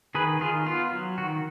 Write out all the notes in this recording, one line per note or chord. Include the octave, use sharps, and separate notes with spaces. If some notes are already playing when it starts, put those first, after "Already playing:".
D#3 G#4 B4
D#3 F4 G#4
B3 F4
F#3
D#3 F#4